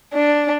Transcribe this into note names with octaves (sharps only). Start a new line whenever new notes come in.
D4